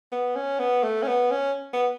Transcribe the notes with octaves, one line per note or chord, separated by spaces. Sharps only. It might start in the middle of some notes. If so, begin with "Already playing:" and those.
B3
C#4
B3
A3
C#4
B3
C#4
B3